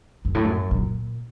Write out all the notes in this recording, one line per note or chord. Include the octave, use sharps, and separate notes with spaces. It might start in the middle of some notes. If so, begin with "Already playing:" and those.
F#2
A2
F#2
A#2